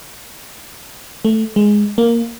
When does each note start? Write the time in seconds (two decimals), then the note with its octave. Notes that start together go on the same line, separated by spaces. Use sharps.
1.25 A3
1.56 G#3
1.98 A#3